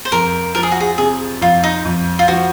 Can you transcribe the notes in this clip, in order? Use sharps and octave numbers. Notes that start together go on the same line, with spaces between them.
C5
F2 A#4
F3 A#4
G#4
F#4
G#4
C3 G#4
F2 F4
D#4
F2
F4
F3 F#4